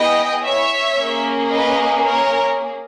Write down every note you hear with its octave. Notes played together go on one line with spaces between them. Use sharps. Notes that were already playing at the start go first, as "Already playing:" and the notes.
Already playing: B3 E4 G#4 D#5 G5
C#5 E5
A#3 C#4 G#4
B4 D#5
A#4 C#5